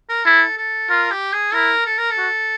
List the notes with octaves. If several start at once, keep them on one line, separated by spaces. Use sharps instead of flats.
A#4
E4 A4
A4
F4 A#4
G4
G#4
E4 A#4
A4
A#4
A4
F#4